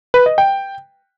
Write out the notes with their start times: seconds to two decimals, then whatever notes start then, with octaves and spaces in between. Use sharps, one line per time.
0.14 B4
0.26 D#5
0.38 G5